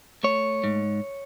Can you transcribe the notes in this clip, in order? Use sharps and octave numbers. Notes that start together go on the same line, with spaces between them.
A3 C#5
G#2